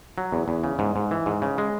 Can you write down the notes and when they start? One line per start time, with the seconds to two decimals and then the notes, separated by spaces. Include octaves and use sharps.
0.18 F#3
0.32 E2
0.48 E2
0.64 C#3
0.79 G#2
0.96 G#2
1.11 E3
1.26 G#2
1.42 C#3
1.58 G#3